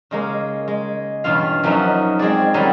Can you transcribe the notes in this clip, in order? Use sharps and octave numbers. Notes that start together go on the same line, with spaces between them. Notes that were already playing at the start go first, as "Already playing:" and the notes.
C#3 G#3 A#3
G#3
E2 G2 B2 C#4 F4 F5
F#2 F3 C#4 D#4 F#4 E5
G#3 C4 G#4 D5
F#2 D#3 F#3 G3 C4 D#4